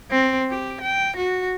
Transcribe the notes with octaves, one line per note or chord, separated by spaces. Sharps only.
C4
G4
G5
F#4